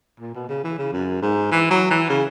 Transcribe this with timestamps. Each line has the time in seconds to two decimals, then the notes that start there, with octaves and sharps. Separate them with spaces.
0.20 A#2
0.34 B2
0.49 C#3
0.64 E3
0.78 C#3
0.92 F#2
1.22 G#2
1.51 E3
1.70 F#3
1.90 E3
2.09 C#3